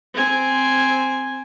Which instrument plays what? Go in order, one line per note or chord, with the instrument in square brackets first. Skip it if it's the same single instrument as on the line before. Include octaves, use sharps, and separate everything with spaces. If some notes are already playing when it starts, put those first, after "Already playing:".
[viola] C4 G#5